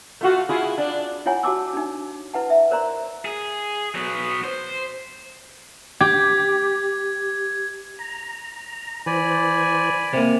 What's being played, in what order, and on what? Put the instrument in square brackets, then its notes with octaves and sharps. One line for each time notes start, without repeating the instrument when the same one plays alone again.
[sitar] A3 F4 F#4
E4 F4 G#4
D4
[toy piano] E4 F4 C#5 F#5 G#5
F#4 A5 D6 E6
D4 D#4
E4 B4 F#5 A5
E5
A#4 C5 D5 A#5 C6
[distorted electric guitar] G#4
F#3 B3
C5
[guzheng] G4 [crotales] G#6
[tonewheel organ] A#5
[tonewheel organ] E3 C5 [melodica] D5 G#5 B5
[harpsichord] C3 A#3